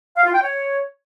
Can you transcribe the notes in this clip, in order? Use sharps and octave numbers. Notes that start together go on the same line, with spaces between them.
F5
F4
G5
C#5